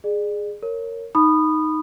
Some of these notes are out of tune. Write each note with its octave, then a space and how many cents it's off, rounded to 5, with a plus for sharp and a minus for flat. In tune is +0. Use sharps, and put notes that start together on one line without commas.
G#4 +0 D5 +35
A#4 -15 C#5 -5
D#4 +0 B5 +0 D#6 -20